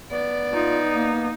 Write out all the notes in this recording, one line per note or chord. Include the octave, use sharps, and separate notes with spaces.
B3 D5
D#4 F4
A#3